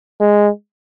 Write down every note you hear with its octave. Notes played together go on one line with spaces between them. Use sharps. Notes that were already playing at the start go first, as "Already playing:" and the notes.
G#3